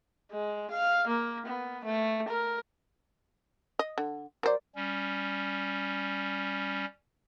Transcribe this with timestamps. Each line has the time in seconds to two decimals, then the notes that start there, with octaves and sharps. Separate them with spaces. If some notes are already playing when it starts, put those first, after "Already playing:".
0.31 G#3
0.71 F5
1.07 A#3
1.46 B3
1.85 A3
2.28 A#4
3.79 D#5
3.98 D3
4.43 F#3 A#4 C5 D5
4.76 G3 C#4